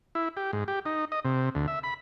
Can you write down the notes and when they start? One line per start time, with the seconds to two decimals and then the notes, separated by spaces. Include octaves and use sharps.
0.15 E4
0.37 G4
0.53 G#2
0.68 G4
0.86 D#4
1.12 D#5
1.25 C3
1.55 D2
1.68 E5
1.83 B5